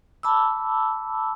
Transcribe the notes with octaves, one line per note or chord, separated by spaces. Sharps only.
A5 B5 D6 E6